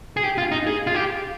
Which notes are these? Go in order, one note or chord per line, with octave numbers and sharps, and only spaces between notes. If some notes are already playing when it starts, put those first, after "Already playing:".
G#4
G4
F4
D#4
G#4
F4
G4